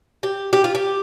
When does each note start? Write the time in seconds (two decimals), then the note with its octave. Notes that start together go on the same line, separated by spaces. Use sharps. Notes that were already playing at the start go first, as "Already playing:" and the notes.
0.23 G4
0.53 G4
0.64 F4
0.75 G4